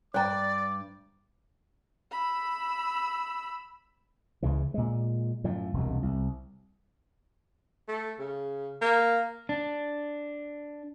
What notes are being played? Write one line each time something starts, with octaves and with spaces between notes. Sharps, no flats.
G2 C5 D5 G5 A#5 D6
B5 E6
C#2 C#3 E3
A#2 G#3
F#2 A2 F3
E1 C2 F#2
C2
A3
C#3
A#3
D4